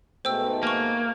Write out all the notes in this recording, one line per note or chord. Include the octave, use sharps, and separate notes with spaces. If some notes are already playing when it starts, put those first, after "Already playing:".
G#2 B2 A3 C5 G5 E6
A#3 G#5 C#6